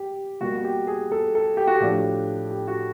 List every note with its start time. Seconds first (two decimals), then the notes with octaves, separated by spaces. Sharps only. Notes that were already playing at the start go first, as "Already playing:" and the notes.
Already playing: G4
0.41 B2 G3 A#3 F#4
0.57 F#4
0.64 G4
0.87 G#4
1.12 A4
1.35 A4
1.57 G4
1.67 F#4
1.75 G4
1.80 A2 F3 A3 D4
2.51 G4
2.68 F#4